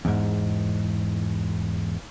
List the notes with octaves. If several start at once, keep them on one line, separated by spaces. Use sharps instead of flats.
E2 G#2